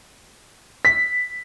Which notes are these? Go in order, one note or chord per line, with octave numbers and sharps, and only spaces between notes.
B6